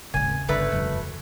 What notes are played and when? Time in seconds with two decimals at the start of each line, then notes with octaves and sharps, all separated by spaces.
0.14 D#1 G#1 C#3 G#5
0.49 G1 D3 A3 B4
0.72 E1 F#2